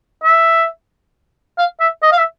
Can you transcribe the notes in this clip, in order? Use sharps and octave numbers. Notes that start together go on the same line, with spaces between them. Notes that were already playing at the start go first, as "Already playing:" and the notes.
E5
F5
E5
D#5
F5
E5